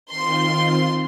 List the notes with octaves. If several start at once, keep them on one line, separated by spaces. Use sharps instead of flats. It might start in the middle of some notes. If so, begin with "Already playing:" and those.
D#3 C4 F4 C6